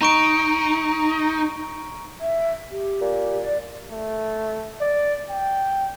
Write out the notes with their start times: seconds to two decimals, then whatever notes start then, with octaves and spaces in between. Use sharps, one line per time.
0.01 D#4 A#5 C#6 D7
2.21 E5
2.71 G4
3.01 A#2
3.41 D5
3.90 A3
4.81 D5
5.30 G5